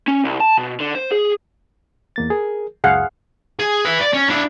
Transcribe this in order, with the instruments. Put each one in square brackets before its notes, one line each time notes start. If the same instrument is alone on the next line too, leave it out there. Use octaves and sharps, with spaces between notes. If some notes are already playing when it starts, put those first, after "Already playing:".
[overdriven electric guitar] C#4
C2
A5
B2
D3
C5
G#4
[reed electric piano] E2 A#3 A6
G#4 A#4
[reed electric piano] C#2 F#2 [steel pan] G#4 F5 F#5
[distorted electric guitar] G#4
B4 E5
D5
C#4
D4 E4